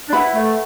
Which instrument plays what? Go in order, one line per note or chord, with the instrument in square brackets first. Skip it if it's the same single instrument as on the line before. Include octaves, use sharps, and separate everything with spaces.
[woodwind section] D4
[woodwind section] E4 [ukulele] B4 F#5 B5
[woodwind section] A3